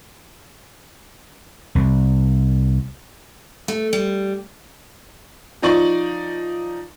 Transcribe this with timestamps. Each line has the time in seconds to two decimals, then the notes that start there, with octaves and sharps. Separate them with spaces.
1.75 C2
3.68 A3
3.93 G3
5.62 F3 D#4 D5 C#6 F#7